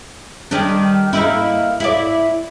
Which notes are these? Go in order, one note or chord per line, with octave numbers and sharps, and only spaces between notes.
D#3 G3 D4
A#3 D#4 E4
E4 D5